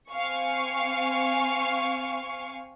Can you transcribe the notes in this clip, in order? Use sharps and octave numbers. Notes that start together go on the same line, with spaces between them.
C4 F5 G#5 C#6